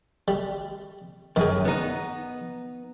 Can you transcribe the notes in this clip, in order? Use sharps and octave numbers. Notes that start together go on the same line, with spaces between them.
G3
F#2 D#3 G#4
B3 D#4